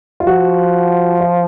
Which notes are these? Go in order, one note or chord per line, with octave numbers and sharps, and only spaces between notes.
F4
F3 F#4
F4